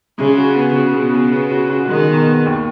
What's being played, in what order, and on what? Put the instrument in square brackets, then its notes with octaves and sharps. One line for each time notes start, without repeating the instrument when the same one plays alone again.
[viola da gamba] C#3 [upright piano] G#3
[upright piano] F#4
B3
[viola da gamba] C#3 [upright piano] F#4
[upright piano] B2
B2
B3
F#4
F#4
[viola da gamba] D#3 [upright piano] G#3
[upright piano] B2
B3
D#2